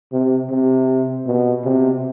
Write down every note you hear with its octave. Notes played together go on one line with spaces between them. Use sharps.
C3
C3
B2
C3